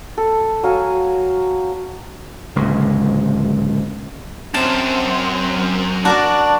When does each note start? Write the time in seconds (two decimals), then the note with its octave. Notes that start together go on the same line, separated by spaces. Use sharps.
0.17 A4
0.63 F#3 F5 G#5 A5
2.55 D1 C#2 A#2
4.54 F#2 C4 A5
6.05 D4 F#4 A#4 D5 A5